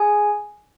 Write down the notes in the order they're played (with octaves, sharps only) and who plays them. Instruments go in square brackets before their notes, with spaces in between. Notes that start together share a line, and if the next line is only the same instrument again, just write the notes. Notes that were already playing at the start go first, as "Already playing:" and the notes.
Already playing: [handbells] G#4 G#5